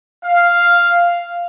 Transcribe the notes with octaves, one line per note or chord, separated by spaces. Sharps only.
F5